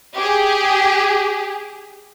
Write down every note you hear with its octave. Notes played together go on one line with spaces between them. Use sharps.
G4 G#4